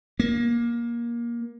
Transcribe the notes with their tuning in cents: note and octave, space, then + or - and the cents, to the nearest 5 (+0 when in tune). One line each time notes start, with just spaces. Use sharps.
A#3 +20